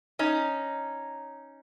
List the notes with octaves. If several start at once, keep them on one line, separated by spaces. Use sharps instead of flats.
C#4 D#4